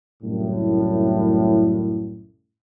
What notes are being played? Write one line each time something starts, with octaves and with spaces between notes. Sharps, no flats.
C2 F#2 A2